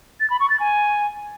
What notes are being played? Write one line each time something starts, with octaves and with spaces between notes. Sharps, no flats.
A6
B5
C#6
A6
G#5